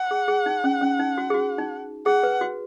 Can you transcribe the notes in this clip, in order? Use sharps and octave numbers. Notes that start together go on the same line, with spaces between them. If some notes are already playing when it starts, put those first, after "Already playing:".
Already playing: F#5
G#4
G#4
D#4
C#4
C#4
D#4
F#4
G#4
F#4
D#4
G#4 F#5
B4
F#4